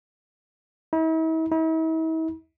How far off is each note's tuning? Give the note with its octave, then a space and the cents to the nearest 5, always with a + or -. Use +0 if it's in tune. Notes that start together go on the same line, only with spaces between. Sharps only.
E4 -45
E4 -45